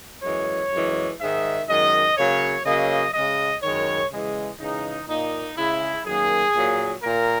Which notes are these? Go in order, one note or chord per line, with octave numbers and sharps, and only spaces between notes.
F#2 E3 G#3 C#5
F#2 E3 G#3
G#2 D#3 G#3 E5
F#2 D#3 G#3 D#5
C#3 F#3 A#3 C#5
C#3 F#3 A#3 D#5
C#3 G#3 D#5
F#2 D#3 G#3 C#5
C#3 E3 G#3
C#3 E3 G#3 D#4
A#2 A#3 D#4
C#3 G#3 E4
F#2 D#3 F#3 A#3 G#4
A#2 F#3 A#3
A#2 A#3 A#4